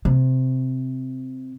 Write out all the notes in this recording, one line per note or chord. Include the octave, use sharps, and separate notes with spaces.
C3